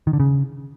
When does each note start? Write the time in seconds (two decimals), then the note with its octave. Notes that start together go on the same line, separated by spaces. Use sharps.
0.07 D#3
0.13 D3
0.20 C#3